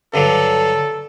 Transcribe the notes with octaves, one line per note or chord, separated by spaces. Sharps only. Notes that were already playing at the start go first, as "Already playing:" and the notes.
G2 D3 F#3 A4